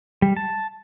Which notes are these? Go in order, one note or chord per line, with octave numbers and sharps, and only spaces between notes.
G3
A5